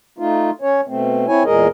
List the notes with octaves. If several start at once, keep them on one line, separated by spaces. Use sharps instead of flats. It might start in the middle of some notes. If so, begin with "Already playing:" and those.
A3 D#4 F4
C#4 C#5
B2 A3 C4
C4 E4 C#5 G#5
E2 A#2 G#3 G#4 A#4 D#5